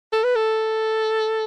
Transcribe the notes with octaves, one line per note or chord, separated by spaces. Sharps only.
A4
B4
A4